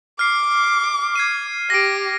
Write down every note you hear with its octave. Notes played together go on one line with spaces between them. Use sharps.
D6 F6 C7
G#6 C7 D#7
G4 A#6 D7